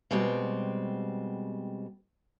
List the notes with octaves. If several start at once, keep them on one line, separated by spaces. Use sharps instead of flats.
B2 G3 G#3 C4